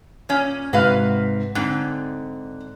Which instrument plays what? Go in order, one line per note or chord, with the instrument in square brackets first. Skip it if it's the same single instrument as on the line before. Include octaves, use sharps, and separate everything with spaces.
[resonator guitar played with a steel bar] A#2 C#4
[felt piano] G#2 C3 [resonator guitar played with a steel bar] F#4 B4 F5
[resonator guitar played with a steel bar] G#2 D3 [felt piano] C4 F#6